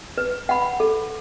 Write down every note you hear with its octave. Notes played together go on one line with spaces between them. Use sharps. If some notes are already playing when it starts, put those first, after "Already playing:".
B4
F#5 B5
A4